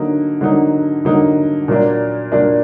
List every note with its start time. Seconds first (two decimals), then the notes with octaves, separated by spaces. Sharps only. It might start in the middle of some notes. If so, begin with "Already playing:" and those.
Already playing: D3 F#3 A#3 D#4
0.41 D3 F#3 A#3 D#4
1.05 D3 F#3 A#3 D#4
1.68 A#2 F#3 A#3 D4
2.32 A#2 F#3 A#3 D4